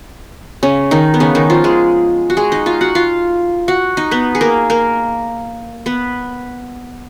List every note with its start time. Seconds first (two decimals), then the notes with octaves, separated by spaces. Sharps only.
0.63 C#3 C#4
0.91 D#3 D#4
1.14 B3
1.20 C#3 C#4
1.35 D#3 D#4
1.50 F3 F4
1.64 G#3 G#4
2.30 F#4
2.37 G#3 G#4
2.52 D#4 D#5
2.66 F4 F5
2.81 F#4 F#5
2.95 F4 F5
3.68 F#4 F#5
3.97 D#4 D#5
4.11 B3 B4
4.35 G#4
4.41 A#3 A#4
4.70 A#3 A#4
5.86 B3 B4